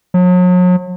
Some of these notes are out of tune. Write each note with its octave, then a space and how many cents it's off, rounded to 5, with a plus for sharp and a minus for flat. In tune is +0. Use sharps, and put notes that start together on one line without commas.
F#3 -40